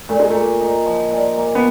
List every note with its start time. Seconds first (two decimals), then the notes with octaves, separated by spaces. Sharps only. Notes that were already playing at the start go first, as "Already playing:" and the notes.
0.09 A#2 A3
0.20 G#3
0.30 A3 A#3
0.61 D#4
0.86 F3
1.11 A#2
1.38 A#3
1.55 B3